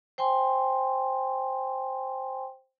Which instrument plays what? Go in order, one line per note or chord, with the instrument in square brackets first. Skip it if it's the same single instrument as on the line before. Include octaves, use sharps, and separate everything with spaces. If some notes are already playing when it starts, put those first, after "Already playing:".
[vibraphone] C5 G5 G#5 C6